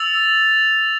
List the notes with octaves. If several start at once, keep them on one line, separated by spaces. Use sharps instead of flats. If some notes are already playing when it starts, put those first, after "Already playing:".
Already playing: E6 A6 F7